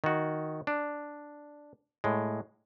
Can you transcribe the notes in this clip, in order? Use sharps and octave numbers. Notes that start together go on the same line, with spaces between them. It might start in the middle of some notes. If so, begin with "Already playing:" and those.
D#3 F#4
D4
A2 G#3